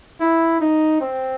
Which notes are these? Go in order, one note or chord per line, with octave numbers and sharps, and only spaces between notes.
E4
D#4
C4